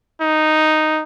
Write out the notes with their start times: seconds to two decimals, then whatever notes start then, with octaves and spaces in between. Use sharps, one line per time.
0.21 D#4